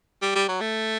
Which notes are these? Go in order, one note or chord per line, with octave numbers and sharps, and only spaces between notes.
G3
G3
F#3
A3